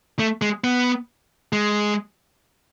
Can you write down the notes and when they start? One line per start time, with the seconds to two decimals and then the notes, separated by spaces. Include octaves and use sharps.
0.19 A3
0.42 G#3
0.64 B3
1.53 G#3